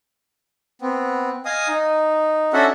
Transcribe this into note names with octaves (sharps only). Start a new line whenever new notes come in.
B3 C4
D#5 F5 G#5 D#6
D#4
C#4 D4 F#4 A4 E5 F#5